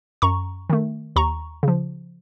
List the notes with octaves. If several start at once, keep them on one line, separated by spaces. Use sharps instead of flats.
F#2 A#5 C#6
D#3 A3
D#2 A#5 C#6
C#3 F3